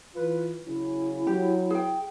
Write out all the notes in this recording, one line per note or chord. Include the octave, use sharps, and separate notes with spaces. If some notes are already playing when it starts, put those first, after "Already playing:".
E3 F4 B4
C#3 F#3 C#4 E4
F#3 G4
G#4 G5